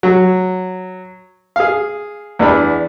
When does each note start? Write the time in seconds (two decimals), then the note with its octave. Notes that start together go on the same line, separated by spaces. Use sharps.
0.03 F#3
1.56 G#4 F5
2.39 E2 B3 D4 B5